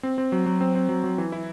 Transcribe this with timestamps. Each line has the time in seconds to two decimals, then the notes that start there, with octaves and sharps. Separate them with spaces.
0.03 C4
0.18 C4
0.32 F#3
0.46 F#3
0.61 C4
0.75 C4
0.89 F#3
1.04 F#3
1.18 E3
1.32 E4